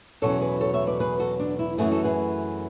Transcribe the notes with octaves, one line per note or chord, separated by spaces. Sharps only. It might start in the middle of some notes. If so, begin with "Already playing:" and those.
E2 B2 F#3 C#4 A4 C#5
G#4 B4
A4 C#5
C#5 E5
B4 D5
G#4 B4
F#4 A4
D4
E4
F#2 E3 A3 E4 G#4
F#4 A4
G#4 B4